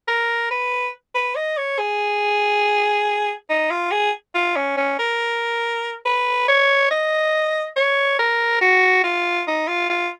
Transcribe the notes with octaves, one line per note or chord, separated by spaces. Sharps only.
A#4
B4
B4
D#5
C#5
G#4
D#4
F4
G#4
F4
C#4
C#4
A#4
B4
C#5
D#5
C#5
A#4
F#4
F4
D#4
F4
F4